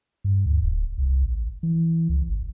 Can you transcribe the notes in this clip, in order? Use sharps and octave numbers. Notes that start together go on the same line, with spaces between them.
G2
D2
D1
C2
A1
E3
C#2
G#1